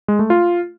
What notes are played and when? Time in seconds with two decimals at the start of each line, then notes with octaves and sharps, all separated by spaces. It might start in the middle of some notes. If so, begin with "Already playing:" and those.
0.08 G#3
0.19 A3
0.30 F4